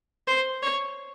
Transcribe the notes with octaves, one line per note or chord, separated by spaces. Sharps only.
C5
C#5